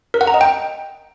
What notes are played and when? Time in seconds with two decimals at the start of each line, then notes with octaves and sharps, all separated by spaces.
0.14 A#4
0.21 F#5
0.27 A#5
0.34 D#5
0.41 G5